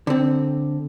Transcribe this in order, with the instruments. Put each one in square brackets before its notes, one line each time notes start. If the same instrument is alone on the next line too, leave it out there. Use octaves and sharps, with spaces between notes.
[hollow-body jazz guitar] D3 C4